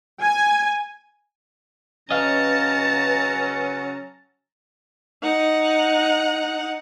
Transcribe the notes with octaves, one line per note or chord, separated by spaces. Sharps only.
G#5
C#3 F#3 C#4 B4 D#5 F5 A5 A#5
D#4 F#5